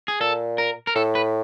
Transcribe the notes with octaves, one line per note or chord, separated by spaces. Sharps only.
G#4
A#2 A4
A#4
A#4
A2 A4
B4